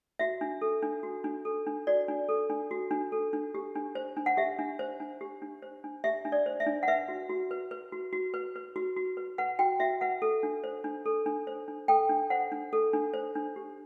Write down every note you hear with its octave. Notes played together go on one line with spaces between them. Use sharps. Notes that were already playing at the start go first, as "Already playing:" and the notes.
F#4 E5
D4
A4
D4
F#4
D4
A4
D4
F#4 D5
D4
A4
D4
F#4
D4
A4
D4
G4
D4
C5
D4
F#5
G4 E5
D4
C5
D4
G4
D4
C5
D4
G4 E5
D4
D5
C5
E5
D4
F#5
B4 E5
F#4
F#4
B4
B4
F#4
F#4
B4
B4
F#4
F#4
B4
B4 F#5
F#4 G5
F#4 E5
B4 F#5
A4
D4
C5
D4
A4
D4
C5
D4
A4 G5
D4
C5 F#5
D4
A4
D4
C5
D4
G4